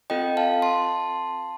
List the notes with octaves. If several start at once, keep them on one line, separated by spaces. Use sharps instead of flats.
C4 F4 A4 D#5 G5
F5 A5
A5 C6